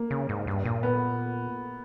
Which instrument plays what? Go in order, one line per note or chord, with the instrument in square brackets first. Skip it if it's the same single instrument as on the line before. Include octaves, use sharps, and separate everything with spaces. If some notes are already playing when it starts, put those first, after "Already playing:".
Already playing: [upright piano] A#3
[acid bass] C#3
G#2
G2
A#2
[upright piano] B3